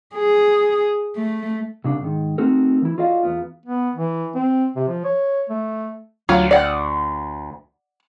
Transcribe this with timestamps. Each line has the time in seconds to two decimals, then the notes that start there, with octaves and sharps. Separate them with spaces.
0.15 G#4
1.17 A3
1.84 C2 C#3 D4
2.02 G#2 D#3
2.38 A3 C4 D#4 F#4 A4 A#4
2.82 E3 E4
2.98 F4 F#4 A4 D5 D#5 F5
3.23 E2 B3 F4
3.66 B3
3.96 E3
4.35 C4
4.76 C3
4.88 F3
5.04 C#5
5.49 A3
6.29 D2 F#3 F4
6.51 D5 F#5